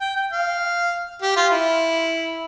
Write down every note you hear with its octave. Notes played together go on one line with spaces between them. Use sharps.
G5
G5
F5
G4
F4
E4